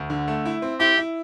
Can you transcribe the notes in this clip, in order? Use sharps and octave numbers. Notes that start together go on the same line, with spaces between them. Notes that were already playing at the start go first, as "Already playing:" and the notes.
Already playing: D2
D3
A3
E4
C4
E4 G4
E4